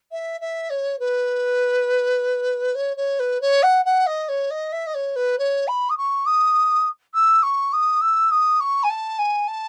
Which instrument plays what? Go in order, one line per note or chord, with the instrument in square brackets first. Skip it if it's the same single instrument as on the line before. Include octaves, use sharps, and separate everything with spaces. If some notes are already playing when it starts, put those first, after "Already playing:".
[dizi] E5
E5
C#5
B4
C#5
C#5
B4
C#5
F#5
F#5
D#5
C#5
D#5
E5
D#5
C#5
B4
C#5
B5
D#6
C#6
D#6
E6
C#6
D#6
E6
D#6
C#6
G#5
A5
G#5
A5